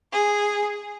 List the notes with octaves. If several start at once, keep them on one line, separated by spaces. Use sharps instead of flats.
G#4